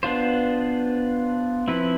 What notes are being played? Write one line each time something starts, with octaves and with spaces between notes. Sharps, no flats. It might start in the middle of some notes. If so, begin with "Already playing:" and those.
B3 D4 F4 C5
F3 C4 E4 B4